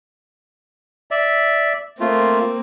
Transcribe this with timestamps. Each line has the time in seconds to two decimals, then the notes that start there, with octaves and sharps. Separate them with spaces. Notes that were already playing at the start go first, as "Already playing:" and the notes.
1.11 D5 E5
2.00 A3 A#3 C4 F4